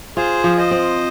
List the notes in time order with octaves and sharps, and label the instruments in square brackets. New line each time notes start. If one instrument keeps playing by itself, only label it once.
[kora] F4 [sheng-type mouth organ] G#4 C5
[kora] F3
[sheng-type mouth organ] C5 D#5
[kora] C4